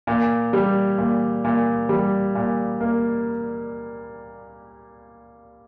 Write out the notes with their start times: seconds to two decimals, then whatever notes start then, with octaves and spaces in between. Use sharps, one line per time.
0.07 A#2
0.53 G3
0.98 A#2
1.44 A#2
1.89 G3
2.35 A#2
2.80 A#3